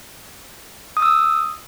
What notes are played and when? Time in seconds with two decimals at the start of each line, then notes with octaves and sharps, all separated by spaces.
0.97 D#6
1.02 E6
1.08 D#6